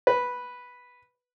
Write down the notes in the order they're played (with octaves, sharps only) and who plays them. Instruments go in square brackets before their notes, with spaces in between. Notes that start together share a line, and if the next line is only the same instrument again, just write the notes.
[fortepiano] B4